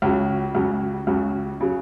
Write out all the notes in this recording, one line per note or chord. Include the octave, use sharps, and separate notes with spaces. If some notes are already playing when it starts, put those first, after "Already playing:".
C#2 C#3 F#3
C#2 C#3 F#3
C#2 C#3 F#3
C#3 F#3